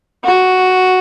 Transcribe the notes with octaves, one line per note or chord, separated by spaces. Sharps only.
F#4